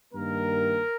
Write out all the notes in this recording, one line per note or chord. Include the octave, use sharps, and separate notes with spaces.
G2 D#3 A#3 A#4